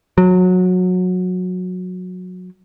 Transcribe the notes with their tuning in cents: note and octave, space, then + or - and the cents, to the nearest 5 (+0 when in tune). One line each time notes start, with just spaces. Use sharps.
F#3 -20